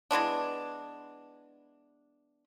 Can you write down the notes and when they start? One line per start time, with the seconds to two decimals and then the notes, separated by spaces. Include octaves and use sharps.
0.11 E3 G#3 B3 D4